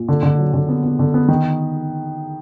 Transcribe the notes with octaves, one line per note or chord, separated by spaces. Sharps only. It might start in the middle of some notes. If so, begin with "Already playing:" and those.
Already playing: A#2
D3
D3
F#3
D3
B3
B3
D3
B3
D#3